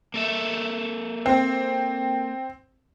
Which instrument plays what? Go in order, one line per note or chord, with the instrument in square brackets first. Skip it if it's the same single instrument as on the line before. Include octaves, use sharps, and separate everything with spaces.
[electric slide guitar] A#3 A4 E5
[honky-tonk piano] C4